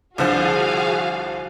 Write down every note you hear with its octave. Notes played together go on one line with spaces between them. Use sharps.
C2 D3 F3 F#4 G#4 F5